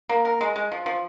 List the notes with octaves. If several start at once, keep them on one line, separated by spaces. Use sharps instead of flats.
A#3
A#4
G#3
G#3
F3
F3